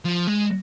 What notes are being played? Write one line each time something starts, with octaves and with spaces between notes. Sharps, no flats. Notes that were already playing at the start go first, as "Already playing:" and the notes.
F3
G#3